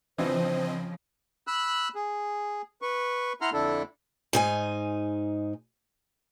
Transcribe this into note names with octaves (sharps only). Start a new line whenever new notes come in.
C#3 E3 F3 C4 D4 F4 C5 D#5
B5 E6 F#6
G#4
B4 C#6
E4 F#5 A#5 C6 F6
F2 D3 D4 E4 A4
G#2 D#4 G#5